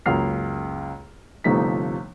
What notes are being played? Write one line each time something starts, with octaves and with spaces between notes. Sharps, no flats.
C#2 F#2 A#3 F6 C7
G1 C3 F3 A3 D#4 B6